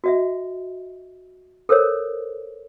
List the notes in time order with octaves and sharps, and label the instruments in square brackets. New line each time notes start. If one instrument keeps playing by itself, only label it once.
[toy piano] F#4 D#5 E5
A4 A#4 C5 C#5